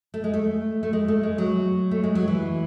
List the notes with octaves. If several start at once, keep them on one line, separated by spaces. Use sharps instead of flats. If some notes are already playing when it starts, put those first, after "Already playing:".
A3
G#3
A3
A3
G#3
A3
G#3
F#3
A3
G#3
F#3
E3